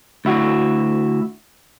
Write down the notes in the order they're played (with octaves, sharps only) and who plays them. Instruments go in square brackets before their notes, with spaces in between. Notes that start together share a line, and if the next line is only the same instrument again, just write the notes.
[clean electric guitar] D2 E4 F#4